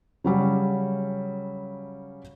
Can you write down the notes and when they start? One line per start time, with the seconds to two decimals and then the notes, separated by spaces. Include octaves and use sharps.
0.24 C#3 F#3 G3 C#4